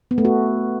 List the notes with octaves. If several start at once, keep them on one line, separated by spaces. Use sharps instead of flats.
B3
A3
F#4